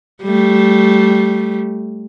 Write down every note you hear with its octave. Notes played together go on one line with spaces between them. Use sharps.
G3 A3